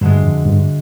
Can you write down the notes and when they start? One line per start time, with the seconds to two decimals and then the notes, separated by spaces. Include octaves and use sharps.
0.01 D2 G2 D3 G#3
0.23 F2
0.45 G2